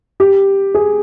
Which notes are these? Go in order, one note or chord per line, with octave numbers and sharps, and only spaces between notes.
G4
G#4